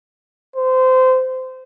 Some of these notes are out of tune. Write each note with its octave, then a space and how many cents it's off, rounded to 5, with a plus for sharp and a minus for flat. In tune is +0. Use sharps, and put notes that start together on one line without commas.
C5 -25